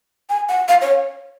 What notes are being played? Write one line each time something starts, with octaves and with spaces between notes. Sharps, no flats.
G#5
F#5
F5
C#5